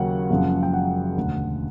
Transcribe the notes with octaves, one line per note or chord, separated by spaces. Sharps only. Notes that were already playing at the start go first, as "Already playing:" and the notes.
Already playing: D#2 C#3 F#3 A#3 C#4 F#5
F#1 F#2 C#3 F3 G#3
G5
F#5
E1 D2 D3